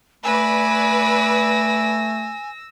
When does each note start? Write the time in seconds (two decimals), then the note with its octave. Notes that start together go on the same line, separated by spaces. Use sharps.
0.24 A3 B4 D5 G#5 E6 A#6